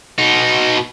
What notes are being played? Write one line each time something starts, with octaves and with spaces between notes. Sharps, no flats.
B2 D#4